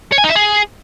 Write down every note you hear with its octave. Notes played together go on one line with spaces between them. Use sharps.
C#5
G#5
D#4
E5
G#4